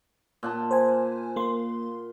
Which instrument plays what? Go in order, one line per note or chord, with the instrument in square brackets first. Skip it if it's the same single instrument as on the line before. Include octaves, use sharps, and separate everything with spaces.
[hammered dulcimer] A#2 F#5 A5
[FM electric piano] C5 G#5
A#3 C6